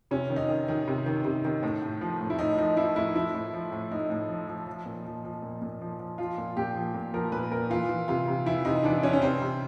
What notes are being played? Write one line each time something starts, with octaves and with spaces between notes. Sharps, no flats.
C3 C#4
D#3
D#4
D#3
D#3
C3
D#3
C3
D#3
A2
A2
F3
A2
E4
A2 D#4
F3 D#4
F3 E4
A2 E4
F3 E4
A2
F3
A2
A2 D#4
A2
F3
F3
F3
A#2
F3
F3
A#2
A#2
F3
F3
F3 F4
A#2
A#2 G4
F3
A#2
F3 A#4
A#2 B4
A#2 A#4
E3 F4
E3
C3 F4
C3
E3 E4
C3 D#4
E3 D4
E3 C#4
C#4
C3 C4
C3